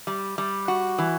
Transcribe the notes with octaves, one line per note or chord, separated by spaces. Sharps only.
G3
G3
F#4
E3